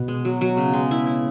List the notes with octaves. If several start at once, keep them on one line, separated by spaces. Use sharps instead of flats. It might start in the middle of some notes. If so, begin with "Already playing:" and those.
Already playing: B2 B3
G#3
F#3
F#3
C#3
G#3
E4
E4